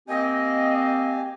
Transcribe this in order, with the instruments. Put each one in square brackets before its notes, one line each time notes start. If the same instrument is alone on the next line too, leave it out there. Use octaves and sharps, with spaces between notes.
[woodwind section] A#3 C4 [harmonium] G4 G#5 [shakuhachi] D#5